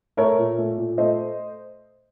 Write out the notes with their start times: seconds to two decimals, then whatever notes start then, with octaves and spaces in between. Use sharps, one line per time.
0.17 A3 A#4 C#5
0.38 A#2
0.58 A3
0.78 A#2
0.98 A3 C5 D#5